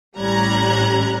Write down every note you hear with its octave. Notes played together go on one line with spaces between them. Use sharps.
A1 G3 C#4 A#5 F#6 G#6